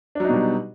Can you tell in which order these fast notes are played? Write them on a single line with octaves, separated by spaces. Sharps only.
D4 F#3 D#4 B2 G3